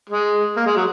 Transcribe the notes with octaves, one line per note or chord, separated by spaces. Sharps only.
G#3
A#3
G#3
F#3